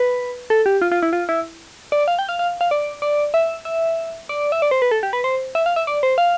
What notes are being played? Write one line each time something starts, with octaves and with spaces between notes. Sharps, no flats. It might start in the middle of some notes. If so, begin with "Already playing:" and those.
Already playing: B4
A4
G4
F4
F4
E4
F4
E4
D5
F5
G5
F5
F5
F5
D5
D5
E5
E5
D5
E5
D5
C5
B4
A4
G4
B4
C5
E5
F5
E5
D5
C5
F5